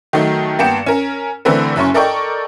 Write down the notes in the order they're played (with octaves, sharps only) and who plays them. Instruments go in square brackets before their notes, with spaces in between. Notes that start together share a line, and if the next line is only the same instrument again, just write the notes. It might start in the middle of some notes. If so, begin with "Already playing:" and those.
[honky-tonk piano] D#3 F#3 A3 D#4
G2 A#3 B3 G5 C#7 E7
C#4 A#4
D3 E3 A3 C4 A#4 B4
F#1 F#2 C#4 C#6
A4 A#4 D5 D#5 G5 C#6